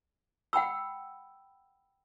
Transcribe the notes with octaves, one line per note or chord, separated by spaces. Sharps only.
F#5 G5 B5 E6